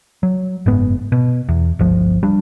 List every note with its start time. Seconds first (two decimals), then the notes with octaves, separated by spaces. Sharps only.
0.23 F#3
0.66 F#1 G#2 B3
1.12 B2
1.49 E2
1.79 G1 C#2 F3
2.23 G3 D4